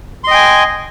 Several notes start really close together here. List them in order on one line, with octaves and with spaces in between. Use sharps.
C6 D#5 G5 G#5